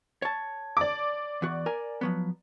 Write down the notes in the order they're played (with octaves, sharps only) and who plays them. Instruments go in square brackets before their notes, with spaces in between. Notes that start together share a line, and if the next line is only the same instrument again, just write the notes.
[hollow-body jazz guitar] C#5 A5
[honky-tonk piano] D5 D6
[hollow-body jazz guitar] E2 F#4
A#4 G#5
F3 F#3 B3